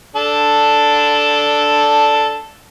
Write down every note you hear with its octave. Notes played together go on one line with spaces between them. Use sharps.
D4 A4